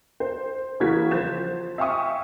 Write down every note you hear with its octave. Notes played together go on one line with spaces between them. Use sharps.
C5
C#3 E3 A#3 F#4 G#6 B6
F3 C5 G6 A6 E7
E5 F5 G5 G#5 C#6 D#6